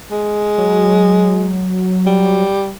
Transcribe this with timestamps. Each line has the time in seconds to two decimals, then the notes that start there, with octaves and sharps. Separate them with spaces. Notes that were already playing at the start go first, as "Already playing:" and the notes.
0.11 G#3
0.58 F#3
2.06 G3